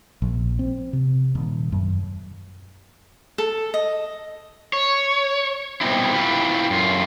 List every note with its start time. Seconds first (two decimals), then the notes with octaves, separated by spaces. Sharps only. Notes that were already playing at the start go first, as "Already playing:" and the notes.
0.22 A#1
0.59 C4
0.93 C3
1.35 D#1
1.72 F#2
3.38 A4
3.74 D#5
4.73 C#5
5.81 B2 G3 B3 C4 D#4 E4
6.13 E4 F4 G4 B4
6.70 F#2 F4